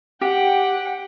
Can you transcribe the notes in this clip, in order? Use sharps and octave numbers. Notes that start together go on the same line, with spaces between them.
G4 F#5 G5